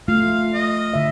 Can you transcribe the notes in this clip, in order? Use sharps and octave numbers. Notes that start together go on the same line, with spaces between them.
A3 F4 F5
D#5
D3 E5